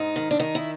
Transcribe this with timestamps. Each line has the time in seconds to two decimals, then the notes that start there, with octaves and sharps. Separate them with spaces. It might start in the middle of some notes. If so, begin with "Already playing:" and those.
Already playing: G#2 D#4
0.16 D#3
0.31 D4
0.40 D#3 D#4
0.55 E4